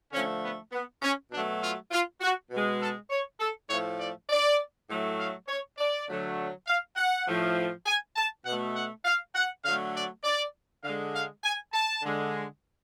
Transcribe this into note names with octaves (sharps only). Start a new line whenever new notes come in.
D3 F3 A3 C#4
B3
B3
C#4
B2 F#3 A3 D4
F4
F4
F#4
B2 G#3
A4
C#5
A4
A2 F3 A3 C#5
D5
D5
A2 F#3 A3
F5
C#5
D5
D3 F#3 A3
F5
F#5
A2 F3 A3
G#5
A5
B2 A3 F#5
F#5
F5
F#5
D3 F#3 A3 F5
D5
D5
D3 G#3 F5
F5
G#5
A5
D3 G#3